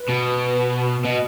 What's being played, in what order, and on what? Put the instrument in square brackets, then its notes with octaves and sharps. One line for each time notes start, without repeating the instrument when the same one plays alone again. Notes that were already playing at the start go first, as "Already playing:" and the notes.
Already playing: [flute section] B4
[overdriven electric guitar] B2
[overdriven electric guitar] B2 [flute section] D#5